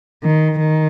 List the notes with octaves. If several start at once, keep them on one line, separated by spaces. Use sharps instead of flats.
D#3
D#3